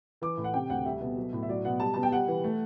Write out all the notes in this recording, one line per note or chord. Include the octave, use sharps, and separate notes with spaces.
E3 D6
A2
F#5
C3 G5
D2 F#5
G3 E5
B2
F#3
A2
E5
F#3 D5
B2 F#5
G3 A5
B2 A5
G5
G3 F#5
E3
A3